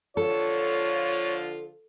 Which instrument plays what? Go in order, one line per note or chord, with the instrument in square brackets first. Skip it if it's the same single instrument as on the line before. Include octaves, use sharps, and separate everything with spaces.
[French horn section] D3 F3 F4 [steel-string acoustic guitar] A4 [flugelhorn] C#5